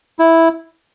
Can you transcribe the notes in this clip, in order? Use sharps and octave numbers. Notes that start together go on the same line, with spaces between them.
E4